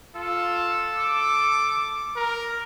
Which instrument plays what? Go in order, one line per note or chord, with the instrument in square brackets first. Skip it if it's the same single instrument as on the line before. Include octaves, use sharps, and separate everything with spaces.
[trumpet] F4 [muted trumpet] A4
[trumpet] D6
A#4